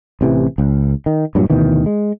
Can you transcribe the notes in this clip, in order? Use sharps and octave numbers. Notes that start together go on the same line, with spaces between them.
A1 C3 E3
C#2
D#3
G2 A#2 F#3
D2 B2 D#3 E3
G#3